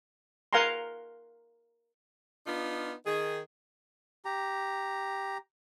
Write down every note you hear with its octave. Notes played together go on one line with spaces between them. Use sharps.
A#4 F5 F#5 G#5 A#5 C6
B3 D4 D#4 F4
D#3 G#4
G4 A#5